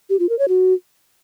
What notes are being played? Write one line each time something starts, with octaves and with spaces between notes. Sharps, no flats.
G4
F4
A#4
C#5
F#4